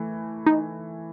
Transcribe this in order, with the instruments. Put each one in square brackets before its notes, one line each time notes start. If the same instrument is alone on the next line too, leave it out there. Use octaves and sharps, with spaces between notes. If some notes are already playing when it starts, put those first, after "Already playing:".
Already playing: [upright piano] E3 A3 E4
[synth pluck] D#4